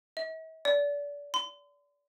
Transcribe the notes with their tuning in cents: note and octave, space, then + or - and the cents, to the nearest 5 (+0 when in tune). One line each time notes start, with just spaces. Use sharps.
E5 -45
D5 -30
C6 -40